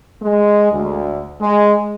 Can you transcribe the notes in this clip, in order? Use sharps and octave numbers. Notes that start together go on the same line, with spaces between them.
G#3
D2
G#3